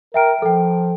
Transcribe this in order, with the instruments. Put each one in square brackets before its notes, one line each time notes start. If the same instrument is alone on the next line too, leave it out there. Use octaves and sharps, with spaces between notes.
[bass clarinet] A#4 [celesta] E5 G5 D7
[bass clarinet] F3 [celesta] A4 G5